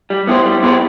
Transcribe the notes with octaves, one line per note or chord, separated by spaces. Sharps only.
G3
B3 E4 G#4 C5
G3
B3 E4 G#4 C5